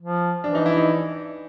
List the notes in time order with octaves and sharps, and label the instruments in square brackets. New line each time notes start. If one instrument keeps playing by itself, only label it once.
[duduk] F3
[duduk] E3 [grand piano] D4
[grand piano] D#4
E4
D#4